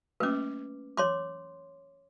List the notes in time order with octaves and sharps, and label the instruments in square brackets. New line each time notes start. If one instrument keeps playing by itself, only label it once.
[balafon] A3 A#3 C#4 [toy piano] B4 D6
[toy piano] C#5 C6 D6